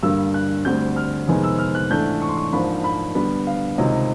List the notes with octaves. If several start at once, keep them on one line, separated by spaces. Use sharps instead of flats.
G2 D3 G3 A#3 E6
F#6
D2 D3 G3 C4 G6
F6
F2 C3 D#3 G#3 B3
E6
F6
F#6
G#2 E3 A3 D4 G6
C#6
C6
C#6
G#2 F3 A#3 D4 B5
B5
D3 G3 B3 B5
F5
C#2 C3 D#3 D#5